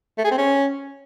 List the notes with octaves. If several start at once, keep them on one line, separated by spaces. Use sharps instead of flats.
A3
G#4
C4
C#4